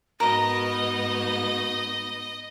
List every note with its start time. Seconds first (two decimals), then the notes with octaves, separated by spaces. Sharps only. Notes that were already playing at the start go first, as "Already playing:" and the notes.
0.20 G#2 B3 D#4 F#4 A#4 D#5